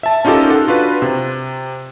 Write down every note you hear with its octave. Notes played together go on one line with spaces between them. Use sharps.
E5 A5
C#4 D#4 F4 G4 A4 A#4
A4 F#5
D4 F4 F#4 B4
C3